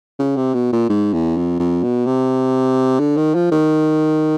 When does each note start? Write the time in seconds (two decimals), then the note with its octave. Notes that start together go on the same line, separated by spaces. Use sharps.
0.19 C#3
0.37 C3
0.54 B2
0.72 A#2
0.89 G#2
1.13 E2
1.37 F2
1.59 F2
1.83 B2
2.06 C3
3.00 D3
3.17 D#3
3.35 F3
3.51 D#3